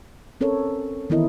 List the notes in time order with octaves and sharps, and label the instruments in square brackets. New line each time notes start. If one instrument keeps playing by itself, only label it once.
[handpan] C4 C#4 A4 A#4 C#5
D#3 E3 B3 E4 A#4 D#5